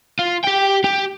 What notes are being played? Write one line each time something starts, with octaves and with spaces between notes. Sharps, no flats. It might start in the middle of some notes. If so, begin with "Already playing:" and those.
F4
G4 G5
G4